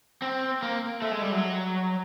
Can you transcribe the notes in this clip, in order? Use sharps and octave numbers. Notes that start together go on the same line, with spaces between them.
C4
A#3
A3
G#3
G3
F#3